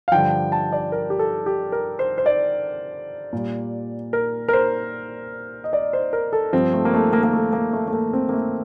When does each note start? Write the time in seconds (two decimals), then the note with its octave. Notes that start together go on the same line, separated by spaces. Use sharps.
0.08 F5
0.12 G2 D3 F3 G5
0.52 A5
0.72 D5
0.92 A#4
1.10 G4
1.19 A4
1.46 G4
1.72 A#4
1.99 C5
2.18 C5
2.26 D5
3.33 A#2 G3
4.13 A#4
4.48 A#4
4.53 C5
5.64 D#5
5.73 D5
5.93 C5
6.13 A#4
6.33 A4
6.53 G2 F3 C4
6.73 A3
6.85 A#3
6.94 A3
7.13 A#3
7.23 A#3
7.33 A3
7.53 A#3
7.73 A3
7.88 A3
7.93 A#3
8.13 C4
8.29 A#3
8.34 A3